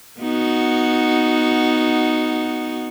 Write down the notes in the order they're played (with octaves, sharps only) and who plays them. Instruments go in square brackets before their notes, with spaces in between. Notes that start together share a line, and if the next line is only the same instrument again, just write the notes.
[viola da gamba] B3 D#4 F#4